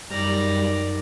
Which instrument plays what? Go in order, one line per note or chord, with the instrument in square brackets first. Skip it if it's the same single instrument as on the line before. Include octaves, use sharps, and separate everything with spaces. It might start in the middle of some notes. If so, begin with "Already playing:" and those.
[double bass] F#2 D#4 [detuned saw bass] G3 [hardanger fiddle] D5 A#5